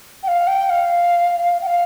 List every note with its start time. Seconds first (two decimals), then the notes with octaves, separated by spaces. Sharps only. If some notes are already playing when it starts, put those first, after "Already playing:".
0.23 G5
0.27 F5
0.47 G5
0.69 F5
1.61 G5
1.66 F5